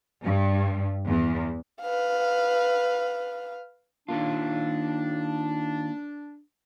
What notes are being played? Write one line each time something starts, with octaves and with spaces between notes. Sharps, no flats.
G2
E2
B4 F5
D#3 A#3 D4 F4